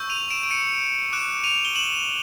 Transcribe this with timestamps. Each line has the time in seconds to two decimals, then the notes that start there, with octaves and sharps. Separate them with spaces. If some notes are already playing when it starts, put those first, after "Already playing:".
Already playing: C#6 E6 G6
0.10 D#7 F7
0.30 D7 E7
0.43 D7
0.50 C#7 D#7
1.12 D6 F#6 D7 E7
1.44 D#7 F7
1.65 G7
1.75 E7 F#7